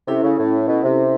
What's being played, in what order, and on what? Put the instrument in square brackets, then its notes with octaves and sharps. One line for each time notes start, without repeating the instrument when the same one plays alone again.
[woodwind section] C3 [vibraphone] C#4 E4 A4
[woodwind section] C#3
A2
B2
C3